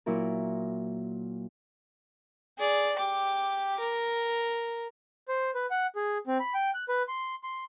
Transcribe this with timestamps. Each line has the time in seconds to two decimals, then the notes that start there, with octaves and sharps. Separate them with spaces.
0.06 A#2 F#3 E4 A#4
2.59 G#4 D5
2.97 G4 D6
3.79 A#4
5.28 C5
5.55 B4
5.71 F#5
5.96 G#4
6.27 C4
6.40 B5
6.54 G5
6.74 F#6
6.89 B4
7.08 C6
7.43 C6